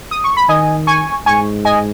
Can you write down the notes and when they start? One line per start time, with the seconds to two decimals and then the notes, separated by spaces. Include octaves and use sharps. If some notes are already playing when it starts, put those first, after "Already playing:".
0.11 D#6
0.24 C#6
0.37 B5
0.48 D#3 D#5 G#5
0.87 G#5 C#6
1.26 G#2 G#5 C#6
1.65 D#5 G#5